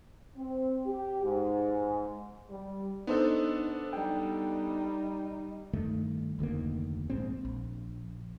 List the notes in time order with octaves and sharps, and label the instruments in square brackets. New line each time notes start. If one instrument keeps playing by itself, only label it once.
[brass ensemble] C4
G4
G#2
G3
[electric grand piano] B3 D4 A4 [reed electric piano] D#4 C5 D#5
[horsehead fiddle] G3 D#4 [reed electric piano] G5
[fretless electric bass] G2 D#3 A3
F1 D2 D#3 A#3
A#1 G#2 C4
A#1